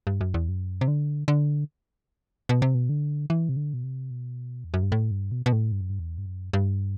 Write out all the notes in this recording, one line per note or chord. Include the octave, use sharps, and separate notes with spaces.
G2
F#2
E2
F#2
C3
D3
D3
B2
C3
B2
D3
E3
C3
D3
B2
C3
B2
E2
F#2
G2
A2
G2
B2
B2
A2
G2
F#2
G2
E2
G2
F#2
G2